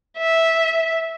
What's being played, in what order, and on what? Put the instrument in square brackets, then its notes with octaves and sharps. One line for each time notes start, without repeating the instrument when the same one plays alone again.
[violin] E5